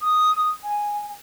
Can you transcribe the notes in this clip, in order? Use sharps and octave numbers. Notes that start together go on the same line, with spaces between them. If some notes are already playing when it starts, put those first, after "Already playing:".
D#6
G#5